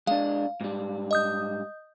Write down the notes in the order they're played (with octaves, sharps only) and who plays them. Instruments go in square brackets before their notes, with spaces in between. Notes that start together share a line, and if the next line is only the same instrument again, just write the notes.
[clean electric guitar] G#3 D4 [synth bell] F5
[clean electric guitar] G#2 G3
[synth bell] D#5 D#6 G6